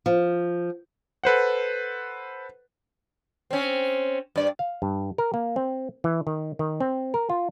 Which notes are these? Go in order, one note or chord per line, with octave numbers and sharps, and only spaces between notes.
F3
A4 B4 C5 F#5
C4 C#4
G2 D5
F5
G2
A#4
A#3
C4
E3
D#3
D#3
C4
A#4
F4